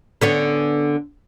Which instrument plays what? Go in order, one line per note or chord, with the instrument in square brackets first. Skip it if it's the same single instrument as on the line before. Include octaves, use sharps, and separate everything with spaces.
[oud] D3 B3 C#4